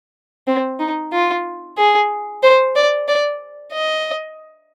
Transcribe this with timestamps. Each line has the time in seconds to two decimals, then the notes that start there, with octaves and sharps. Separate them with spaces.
0.47 C4
0.80 D#4
1.13 F4
1.77 G#4
2.43 C5
2.76 D5
3.08 D5
3.73 D#5